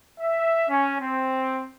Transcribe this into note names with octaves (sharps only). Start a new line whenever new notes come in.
E5
C#4
C4